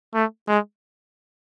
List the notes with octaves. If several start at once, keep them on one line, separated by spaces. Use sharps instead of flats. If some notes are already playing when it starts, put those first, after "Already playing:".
A3
G#3